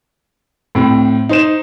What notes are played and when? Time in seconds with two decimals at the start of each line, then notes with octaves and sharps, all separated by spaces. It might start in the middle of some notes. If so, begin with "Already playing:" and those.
0.75 A2 C4
1.29 D#4 C5 E7